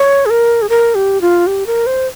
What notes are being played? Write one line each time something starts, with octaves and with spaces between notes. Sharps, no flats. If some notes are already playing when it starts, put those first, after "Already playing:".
Already playing: C#5
G#4
A#4
G#4
A#4
G4
F4
G4
A#4
C5